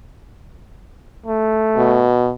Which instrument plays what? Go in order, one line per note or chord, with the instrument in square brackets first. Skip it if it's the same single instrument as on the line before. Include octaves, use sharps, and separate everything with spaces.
[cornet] A3
[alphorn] B2